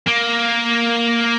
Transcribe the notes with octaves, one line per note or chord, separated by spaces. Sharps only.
A#3